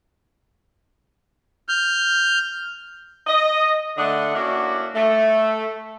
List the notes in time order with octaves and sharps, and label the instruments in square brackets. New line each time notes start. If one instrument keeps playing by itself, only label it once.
[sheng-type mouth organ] F6 G6
[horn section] D#5
D3 A3 D4 D#5 F#5
A#3 C#4 D4 E4 F#4
A3